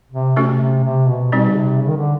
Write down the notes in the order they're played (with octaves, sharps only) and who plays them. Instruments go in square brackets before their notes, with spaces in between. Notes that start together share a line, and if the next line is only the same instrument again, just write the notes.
[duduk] C3
[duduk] C3 [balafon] A3 C#4 F#4 A4
[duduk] C3
C3
B2
[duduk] B2 [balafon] G3 C4 D#4
[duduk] C#3
C3
C#3
D#3
D3